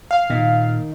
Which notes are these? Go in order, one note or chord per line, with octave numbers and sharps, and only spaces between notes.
F5
A#2 D#3